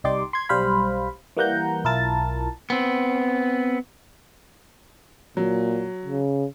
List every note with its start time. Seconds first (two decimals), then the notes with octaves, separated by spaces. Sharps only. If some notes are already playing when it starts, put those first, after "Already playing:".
0.04 C2 D#4 G4 D5 C6 D6
0.33 C6 G#6
0.49 B1 G3 C5 F5 B5
1.37 E3 G3 A#3 F#5 A#5 G6
1.84 B1 E4 F4 A#4 A5 A6
2.70 B3 C4
5.37 A#2 F#3
6.06 C#3